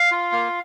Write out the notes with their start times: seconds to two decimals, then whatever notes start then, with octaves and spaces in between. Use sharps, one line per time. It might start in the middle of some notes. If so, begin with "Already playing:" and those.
Already playing: F5
0.11 F4
0.32 A#3